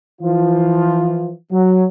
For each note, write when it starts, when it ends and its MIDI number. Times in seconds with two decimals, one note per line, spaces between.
0.22 1.32 52
0.22 1.32 53
0.22 1.32 65
1.52 1.85 54